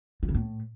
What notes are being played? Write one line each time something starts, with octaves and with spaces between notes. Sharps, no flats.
F3
C#3
A2